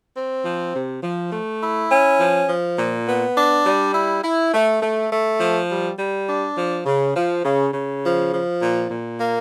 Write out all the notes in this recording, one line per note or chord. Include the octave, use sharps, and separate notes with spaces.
C4
F3
C3
F3
A3
E4
C#4
F3
F3
A#2
B3
D4
G3
E4
E4
A3
A3
A3
F3
G3
G3
D4
F3
C#3
F3
C#3
C#3
F3
F3
A#2
A#2
A#3